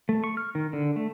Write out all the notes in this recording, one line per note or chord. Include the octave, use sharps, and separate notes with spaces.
A3
C#6
F6
D#3
D3
A3